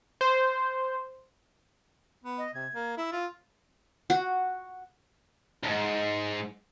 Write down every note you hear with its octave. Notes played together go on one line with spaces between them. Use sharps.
C5
B3
D#5
C3 G#6
A#3
E4 E6
F4
F#4
D2 G#2